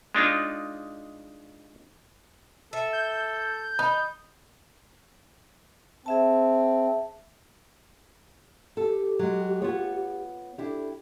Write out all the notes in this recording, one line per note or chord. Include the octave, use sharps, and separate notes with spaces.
G#3 D4 D#4 F4
A4 E5
G6
D#4 B5
C4 G#4 E5 A5
G4 A4
F#3 G#3
B3 F4 C#5
D4 E4 G4 A4